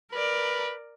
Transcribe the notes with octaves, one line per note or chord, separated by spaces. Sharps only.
A#4 B4 D5